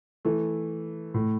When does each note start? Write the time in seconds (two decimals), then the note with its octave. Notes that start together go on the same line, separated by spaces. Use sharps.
0.25 E3 A3
1.14 A2